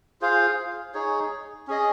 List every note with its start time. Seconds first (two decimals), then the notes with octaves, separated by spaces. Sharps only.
0.21 F4 G#4 C5 F5
0.94 D#4 G#4 C#5
1.67 C#4 G#4 D#5